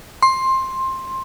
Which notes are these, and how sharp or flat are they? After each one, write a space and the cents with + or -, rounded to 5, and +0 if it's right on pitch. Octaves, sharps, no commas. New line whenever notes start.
C6 +15